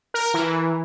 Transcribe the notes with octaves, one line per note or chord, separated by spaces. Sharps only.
A#4
E3